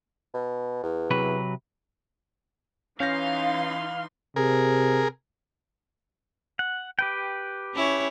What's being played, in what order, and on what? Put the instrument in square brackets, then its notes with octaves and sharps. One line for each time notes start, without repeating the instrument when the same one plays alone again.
[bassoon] B2
E2
[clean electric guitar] C3 F#3 B4
[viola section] E3 D#4 C6 [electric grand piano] C#4 G6 A#6 [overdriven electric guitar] F5
[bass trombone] C3 [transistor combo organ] G#4 A#4
[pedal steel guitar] F#5
G4 B4 G5
[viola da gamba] C#4 E4 C#5